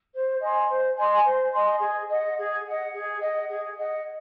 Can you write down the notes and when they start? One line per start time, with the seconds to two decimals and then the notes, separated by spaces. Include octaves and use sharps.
0.12 C5
0.40 D#5 G#5 C6
0.68 C5
0.96 D#5 G#5 C6
1.25 C5
1.52 D#5 G#5 C6
1.80 G#4
2.09 D#5 F#5
2.37 G#4
2.64 D#5 F#5
2.93 G#4
3.21 D#5 F#5
3.48 G#4
3.77 D#5 F#5